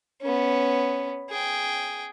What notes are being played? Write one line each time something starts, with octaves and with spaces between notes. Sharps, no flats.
B3 C#4
G#4 G5